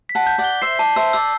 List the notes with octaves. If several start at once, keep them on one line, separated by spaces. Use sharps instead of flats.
B6
F#5 A5
G6
D5 F#5
G7
C5 E5 C7
D5 A5
C5 E5 E6
D5 E6